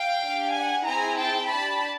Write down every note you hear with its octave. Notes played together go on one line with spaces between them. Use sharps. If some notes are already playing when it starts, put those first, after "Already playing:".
Already playing: F5 G5
D4 G4
F#5 G#5
C4 E4 G#4 G#5 A#5
G5 A5
D4 G4 A5 B5